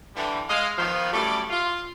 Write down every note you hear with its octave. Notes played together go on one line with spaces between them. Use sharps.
D3 E3 G3
G#3 D#5 F5
D#3 F3 B3
F#2 A2 G3 A3 D5
F4